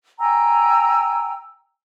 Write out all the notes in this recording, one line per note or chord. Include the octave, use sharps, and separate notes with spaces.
G5 G#5 A#5 E6